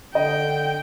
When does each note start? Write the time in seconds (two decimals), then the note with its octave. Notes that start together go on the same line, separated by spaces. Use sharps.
0.15 D3 D#5 G5